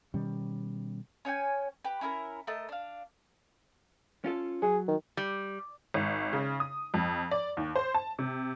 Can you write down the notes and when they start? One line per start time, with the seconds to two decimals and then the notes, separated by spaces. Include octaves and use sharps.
0.14 B2 D#3 G3 C#4
1.25 C#4 C#5 G5 G#5
1.85 G4 B4
2.01 C#4 E4 A4 A#4
2.47 A3 A#4 D#5 A5
2.69 D4 F5
4.24 C#4 F4 A4
4.62 F#3 G#4
4.88 D#3
5.17 G3
5.94 G#1
6.33 C#3
6.60 D#6
6.94 F2
7.31 D5
7.57 D#2
7.75 C5
7.94 A5
8.19 C3